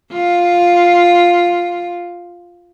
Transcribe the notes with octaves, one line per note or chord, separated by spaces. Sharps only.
F4